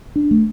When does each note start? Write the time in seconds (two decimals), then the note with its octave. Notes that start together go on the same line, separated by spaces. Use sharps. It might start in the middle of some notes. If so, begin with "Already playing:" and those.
0.16 D4
0.31 A3